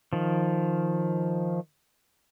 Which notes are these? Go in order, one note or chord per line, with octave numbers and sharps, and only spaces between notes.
D#3 F3